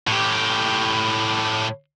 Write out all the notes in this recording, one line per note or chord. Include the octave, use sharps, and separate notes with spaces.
A2 G4